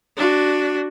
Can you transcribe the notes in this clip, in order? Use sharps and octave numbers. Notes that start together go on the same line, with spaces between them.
D4 F#4